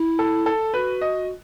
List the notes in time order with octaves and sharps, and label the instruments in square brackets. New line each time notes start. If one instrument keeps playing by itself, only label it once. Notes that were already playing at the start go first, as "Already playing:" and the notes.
Already playing: [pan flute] E4
[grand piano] A4
A4
[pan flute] F#4 [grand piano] B4
[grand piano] D#5